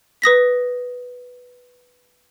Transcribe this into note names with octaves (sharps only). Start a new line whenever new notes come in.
B4 D#6 A#6 B6